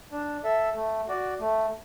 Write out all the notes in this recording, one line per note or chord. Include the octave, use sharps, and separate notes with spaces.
D4
A4 E5
A3
F#4 D5
A3